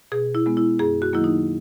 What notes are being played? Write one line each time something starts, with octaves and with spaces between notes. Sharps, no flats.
B2 G#4
E4
G#3 B3
E4
F#2 G#4
F#4
D#3 F#3 A#3 E4
D#4